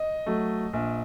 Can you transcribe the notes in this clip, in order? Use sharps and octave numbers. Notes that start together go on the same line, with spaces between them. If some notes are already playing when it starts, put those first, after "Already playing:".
Already playing: D#5
F#3 A3
A#1